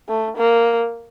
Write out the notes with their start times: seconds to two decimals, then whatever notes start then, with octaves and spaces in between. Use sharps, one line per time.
0.09 A3
0.37 A#3